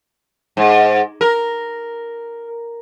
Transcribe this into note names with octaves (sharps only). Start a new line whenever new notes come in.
G#2
A#4